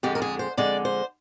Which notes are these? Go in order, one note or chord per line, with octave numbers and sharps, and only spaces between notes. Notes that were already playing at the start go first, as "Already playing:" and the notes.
F2 D3 G#3 G4
A#4
G#4
C5
F2 D3 G#3 D5
C5